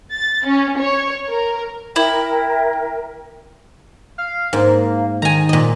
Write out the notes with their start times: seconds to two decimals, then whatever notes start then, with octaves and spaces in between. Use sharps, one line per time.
0.12 A6
0.46 C#4
0.79 C#5
1.30 A#4
1.96 E4 A#4 E5 G5
4.18 F5
4.53 G#2 A#3
5.22 D#3 G#5 A#5
5.49 A#2 D#5